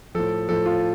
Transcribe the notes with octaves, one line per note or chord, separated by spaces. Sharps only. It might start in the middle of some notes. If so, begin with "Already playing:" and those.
A2 F3 A4
A2 F3 A4
F4